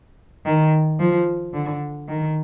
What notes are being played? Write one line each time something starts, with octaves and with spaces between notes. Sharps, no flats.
D#3
F3
D3
D#3